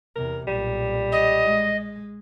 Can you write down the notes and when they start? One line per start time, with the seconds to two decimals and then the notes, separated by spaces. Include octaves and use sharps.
0.16 E2 C3 A#4
0.47 B1 A#2 G3
1.12 D#5
1.44 G#3